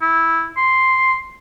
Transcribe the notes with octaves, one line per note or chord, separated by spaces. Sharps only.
E4
C6